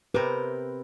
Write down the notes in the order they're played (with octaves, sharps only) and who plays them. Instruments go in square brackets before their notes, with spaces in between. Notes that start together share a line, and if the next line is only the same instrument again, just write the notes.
[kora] C3 C4 A#4 [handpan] B4